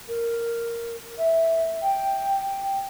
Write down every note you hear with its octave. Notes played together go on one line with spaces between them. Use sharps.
A#4
E5
G5